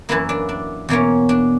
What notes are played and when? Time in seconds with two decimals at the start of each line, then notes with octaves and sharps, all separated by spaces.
0.09 F#2 E3 A#3 E4
0.29 D4
0.49 D4
0.89 E2 B2 A#3 C#4
1.29 D4